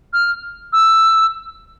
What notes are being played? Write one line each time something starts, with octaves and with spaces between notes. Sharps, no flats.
F6
E6